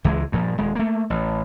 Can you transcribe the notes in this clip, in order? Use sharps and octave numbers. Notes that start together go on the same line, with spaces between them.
C#2 E3 G3 G#3
G2 A#2 F3
D#1 G#3
A3 A#3
A1